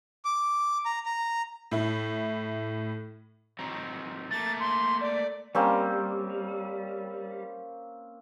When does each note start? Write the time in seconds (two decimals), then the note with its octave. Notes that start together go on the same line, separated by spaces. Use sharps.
0.25 D6
0.86 A#5
1.06 A#5
1.71 A2 E4
3.59 F#3 C4 D#4
4.31 A3 A#3 A6
4.60 C6
5.01 D5
5.55 G3 A#3 C4 C#4